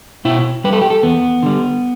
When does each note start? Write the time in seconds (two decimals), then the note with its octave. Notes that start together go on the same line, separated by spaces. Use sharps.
0.25 B2 E4
0.64 G3 B4
0.73 A4
0.81 G4
0.90 A4
1.03 E2 B3
1.43 D3 G3